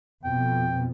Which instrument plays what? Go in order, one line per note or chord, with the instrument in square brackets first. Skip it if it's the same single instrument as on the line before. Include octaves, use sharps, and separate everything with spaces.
[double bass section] F2 B2 [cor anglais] G5